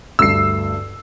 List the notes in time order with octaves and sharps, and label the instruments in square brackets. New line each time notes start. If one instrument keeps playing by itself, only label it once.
[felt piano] D2 G2 [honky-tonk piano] E6 C7